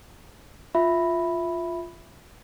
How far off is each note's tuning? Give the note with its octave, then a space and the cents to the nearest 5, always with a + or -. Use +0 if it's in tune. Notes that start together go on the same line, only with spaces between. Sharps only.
F4 +0 E5 +0 B5 +0